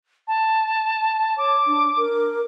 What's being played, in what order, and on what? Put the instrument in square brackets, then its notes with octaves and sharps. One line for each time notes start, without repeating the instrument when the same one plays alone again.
[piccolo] A5
[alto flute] C#5 [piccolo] D6
[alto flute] D4
A#4